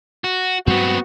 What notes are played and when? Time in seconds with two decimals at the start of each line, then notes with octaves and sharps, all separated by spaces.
0.24 F#4
0.67 G2 F#3 G#3 B3 C4 F#4